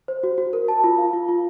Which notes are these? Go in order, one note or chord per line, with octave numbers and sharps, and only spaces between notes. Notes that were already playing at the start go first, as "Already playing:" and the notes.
C5
F#4
F#4
A#4
A5
F4
F5
F4
F4